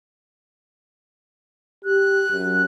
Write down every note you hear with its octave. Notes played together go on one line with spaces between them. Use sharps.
G4 F#6
F#2